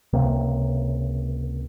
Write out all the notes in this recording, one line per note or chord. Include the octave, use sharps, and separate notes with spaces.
C#2 C3 A#3